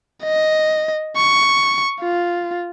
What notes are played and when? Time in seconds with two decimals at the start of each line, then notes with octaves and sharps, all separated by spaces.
0.24 D#5
1.16 C#6
2.00 F4